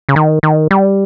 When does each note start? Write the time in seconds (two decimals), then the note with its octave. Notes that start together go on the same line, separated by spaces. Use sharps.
0.09 C#3
0.16 D#3
0.43 D#3
0.71 G3